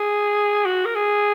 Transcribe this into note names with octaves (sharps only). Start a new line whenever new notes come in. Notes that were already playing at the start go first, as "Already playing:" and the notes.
Already playing: G#4
F#4
A#4
G#4